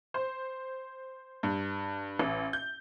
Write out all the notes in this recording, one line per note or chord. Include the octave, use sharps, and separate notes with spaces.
C5
G2
A1
G6